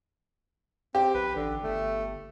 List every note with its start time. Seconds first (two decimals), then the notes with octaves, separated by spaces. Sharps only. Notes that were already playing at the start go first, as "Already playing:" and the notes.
0.95 C4 G4
1.14 B1 B4
1.36 A1 D3
1.63 G1 A3